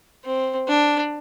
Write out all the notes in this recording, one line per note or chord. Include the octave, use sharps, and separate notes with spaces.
C4
D4